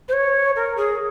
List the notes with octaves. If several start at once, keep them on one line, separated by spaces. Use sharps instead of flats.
C5
C#5
A#4
G#4